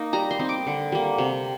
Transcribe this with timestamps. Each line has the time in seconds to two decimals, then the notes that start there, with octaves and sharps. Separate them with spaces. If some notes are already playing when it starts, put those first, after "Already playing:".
Already playing: A#3 D#4
0.13 G3 A#5
0.31 C6
0.39 C4 D#4
0.49 D6
0.67 D3
0.92 G3 A#3
1.18 C3